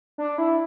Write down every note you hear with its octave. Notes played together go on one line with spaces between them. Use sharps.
D4
E4